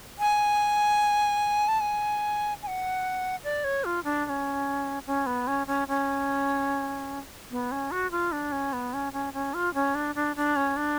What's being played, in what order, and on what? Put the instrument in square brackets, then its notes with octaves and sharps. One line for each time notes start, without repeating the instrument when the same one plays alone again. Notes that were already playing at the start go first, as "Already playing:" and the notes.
[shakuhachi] G#5
A5
G#5
G#5
F#5
D5
C#5
F4
D4
D4
C#4
C#4
B3
C#4
C#4
C#4
B3
C#4
F#4
F4
D4
C#4
B3
C#4
C#4
C#4
F4
C#4
D4
D4
D4
C#4
D4